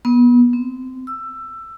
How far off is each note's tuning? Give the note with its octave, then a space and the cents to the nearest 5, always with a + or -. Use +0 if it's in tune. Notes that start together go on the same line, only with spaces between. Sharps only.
B3 -25
C4 -25
E6 +15